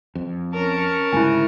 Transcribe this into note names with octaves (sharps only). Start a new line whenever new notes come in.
F2
C#4 A#4 A5
D2 G#2 C#3 E4 G#5